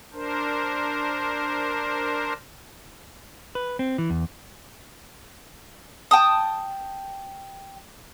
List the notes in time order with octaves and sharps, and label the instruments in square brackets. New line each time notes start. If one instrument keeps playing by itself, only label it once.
[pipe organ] D4 A#4 C5
[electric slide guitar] B4
C4
E3
E2
[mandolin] G5 A5 D#6